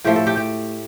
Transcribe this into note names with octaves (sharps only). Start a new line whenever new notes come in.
A2 F3 A3 G4
A4
G4
G4